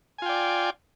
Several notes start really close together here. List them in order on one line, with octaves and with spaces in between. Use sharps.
G#5 F4 G5 D5